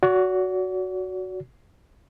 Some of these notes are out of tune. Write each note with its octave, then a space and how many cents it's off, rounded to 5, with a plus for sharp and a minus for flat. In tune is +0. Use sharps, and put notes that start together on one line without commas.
F#4 +0 D5 -45